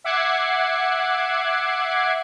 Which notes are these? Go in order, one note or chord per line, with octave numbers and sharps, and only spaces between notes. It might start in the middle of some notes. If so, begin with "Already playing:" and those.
E5 F#5 D6 F#6 G#6 C7